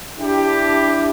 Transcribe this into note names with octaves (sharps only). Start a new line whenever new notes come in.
D4 E4 G4